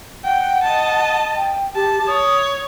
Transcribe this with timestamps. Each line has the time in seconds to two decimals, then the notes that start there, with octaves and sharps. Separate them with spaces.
0.25 F#5 G5
0.63 D#5 A5
1.36 G5
1.75 G4 A5
2.07 C#5 D#6